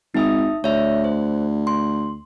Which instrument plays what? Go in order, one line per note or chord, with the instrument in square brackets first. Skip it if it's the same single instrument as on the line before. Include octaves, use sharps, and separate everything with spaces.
[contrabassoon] G#1 [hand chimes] D#4 E5 D#6
[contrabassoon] D2 [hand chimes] C#5 E5
[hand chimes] C5
C6